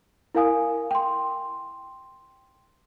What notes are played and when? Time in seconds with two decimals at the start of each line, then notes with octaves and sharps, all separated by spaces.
0.35 E4 A#4 F5 G#5 D#6
0.91 G5 C6